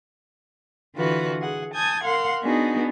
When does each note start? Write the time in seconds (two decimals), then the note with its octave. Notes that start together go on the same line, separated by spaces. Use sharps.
0.95 D3 E3 F4 F#4 B4
1.40 G#4 F#5
1.73 G#5 A5 D#6 G6 G#6
2.03 A#4 F5 F#5 C6
2.43 B3 D4 D#4 F#4 G#4